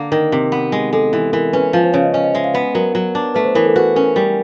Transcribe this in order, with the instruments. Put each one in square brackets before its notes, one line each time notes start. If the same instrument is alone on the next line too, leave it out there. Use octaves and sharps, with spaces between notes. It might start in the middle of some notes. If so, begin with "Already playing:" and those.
Already playing: [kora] D3 A#3
[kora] D#3 [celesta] A#4
[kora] C3
B3
G#3
[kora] G#3 [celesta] A4
[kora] E3
[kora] E3 [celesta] A#4
[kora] C#4 [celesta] B4
[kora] F3 [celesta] B4
[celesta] C5
[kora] C#3 [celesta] C#5
[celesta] D#5
[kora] C#4 [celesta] D#5
[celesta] D#5
[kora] G#3 [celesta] E5
[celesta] F5
[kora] B3 [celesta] B4
[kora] F#3 [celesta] A#4
[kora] F#3
D4
[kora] A3 [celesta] B4
[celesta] C5
[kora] E3 [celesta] A#4
[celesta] A4
[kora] F#4 [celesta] B4
[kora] C#4 [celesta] A#4
[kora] G3 [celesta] A#4